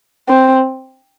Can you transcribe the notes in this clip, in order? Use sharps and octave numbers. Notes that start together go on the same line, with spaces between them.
C4